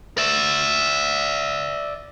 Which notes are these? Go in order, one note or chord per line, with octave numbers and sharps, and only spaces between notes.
D5 E5